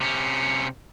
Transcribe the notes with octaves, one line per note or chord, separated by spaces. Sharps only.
C3 C#4